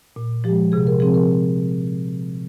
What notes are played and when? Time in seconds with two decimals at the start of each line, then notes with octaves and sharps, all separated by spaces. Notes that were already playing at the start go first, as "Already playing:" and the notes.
0.16 A#2
0.44 F3 G#3 G4
0.72 C3 G#4
0.87 A#4
1.00 F3 C4 G#4
1.14 A#4